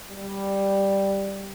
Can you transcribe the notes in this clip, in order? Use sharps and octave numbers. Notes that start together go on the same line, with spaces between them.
G3